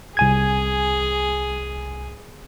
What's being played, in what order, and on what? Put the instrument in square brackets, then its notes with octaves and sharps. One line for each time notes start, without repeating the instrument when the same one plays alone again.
[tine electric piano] C2 G#5 G#6 [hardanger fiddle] G#4